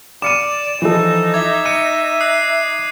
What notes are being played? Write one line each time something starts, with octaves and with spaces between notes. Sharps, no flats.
D5 D6 C#7 D#7 E7
E3 F3 D#4 A4
E5 D6 G#6
C#7 D#7
D#6 F#6 C7